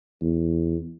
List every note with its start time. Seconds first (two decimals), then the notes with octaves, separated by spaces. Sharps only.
0.22 E2